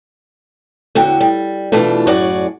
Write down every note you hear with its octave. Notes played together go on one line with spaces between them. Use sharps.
E2 D3 F#4 G5
G3
B2 E3 A3 D4 F4
F#2 A2 F#4 G#4 D5